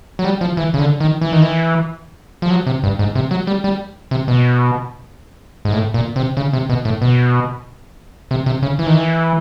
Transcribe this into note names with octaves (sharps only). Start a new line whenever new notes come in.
F#3
G3
F3
E3
C#3
D3
D#3
E3
D#3
E3
F3
F#3
C3
G2
G#2
C3
F#3
G3
G3
C3
B2
G#2
A2
A#2
C3
C#3
C3
B2
A2
B2
C3
C3
C#3
E3
D#3
E3